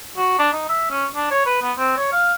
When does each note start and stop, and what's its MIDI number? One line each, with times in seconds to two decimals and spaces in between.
0.17 0.34 66
0.39 0.50 62
0.52 0.68 63
0.69 0.86 76
0.91 1.06 61
1.15 1.31 62
1.31 1.41 73
1.46 1.59 71
1.62 1.72 59
1.78 1.93 60
1.97 2.10 73
2.12 2.33 77